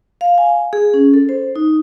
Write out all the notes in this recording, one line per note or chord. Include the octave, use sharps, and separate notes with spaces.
F5
G#5
G#4
C#4
A4
C5
D#4